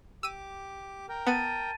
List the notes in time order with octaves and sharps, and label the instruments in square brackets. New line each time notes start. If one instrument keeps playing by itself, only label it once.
[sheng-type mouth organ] G4 D6 [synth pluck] E6 D#7
[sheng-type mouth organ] A#4 G5
[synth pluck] B3 [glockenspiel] A5 A6 D#7